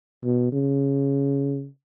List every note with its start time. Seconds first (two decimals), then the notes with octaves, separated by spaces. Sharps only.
0.24 B2
0.52 C#3